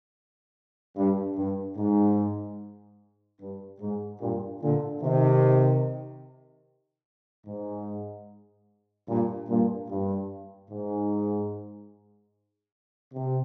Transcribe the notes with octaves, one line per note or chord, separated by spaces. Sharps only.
G2
G2
G#2
G2
G#2
G2 A#2
A#2 D3
C3 D#3
G#2
G2 A#2
G2 A#2
G2
G#2
C3